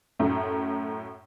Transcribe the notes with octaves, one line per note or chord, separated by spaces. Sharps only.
F#2 A2 A3